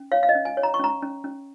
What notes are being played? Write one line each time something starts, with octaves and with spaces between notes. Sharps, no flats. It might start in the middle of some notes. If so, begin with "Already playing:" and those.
Already playing: C#4
C#5 F5
F5
D#5
C#4
G#5
C#5
A#5
C#6
C#4 A#5
C#4
C#4